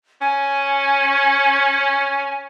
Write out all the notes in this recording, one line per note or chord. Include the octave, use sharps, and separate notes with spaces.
C#4 G#5